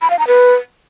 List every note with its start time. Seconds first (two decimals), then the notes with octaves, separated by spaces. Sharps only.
0.02 B5
0.10 F5
0.19 A#5
0.27 B4